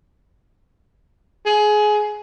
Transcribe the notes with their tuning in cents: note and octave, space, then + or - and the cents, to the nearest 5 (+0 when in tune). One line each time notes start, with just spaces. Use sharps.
G#4 +20